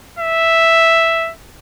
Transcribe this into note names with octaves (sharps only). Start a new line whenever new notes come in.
E5